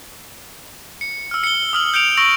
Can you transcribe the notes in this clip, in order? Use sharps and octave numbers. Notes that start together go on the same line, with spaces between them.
C#7
E6 F6
C#7 G7
D#6 F6 F#7
G6 C#7 D7 F7
C#6 E6 A#6 D7 F#7